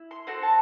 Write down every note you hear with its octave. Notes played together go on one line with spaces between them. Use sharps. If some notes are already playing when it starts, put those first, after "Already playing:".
Already playing: E4
C6
C4 F#4 A4 C6
A5